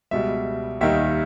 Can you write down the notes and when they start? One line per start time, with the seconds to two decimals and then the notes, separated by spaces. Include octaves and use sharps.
0.11 C#2 B2 G3 E5
0.81 D#2 D#3 G3 E5